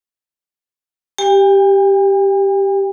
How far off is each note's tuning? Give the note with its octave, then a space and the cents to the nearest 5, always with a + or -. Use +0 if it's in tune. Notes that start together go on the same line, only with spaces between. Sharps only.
G4 -5 G5 +45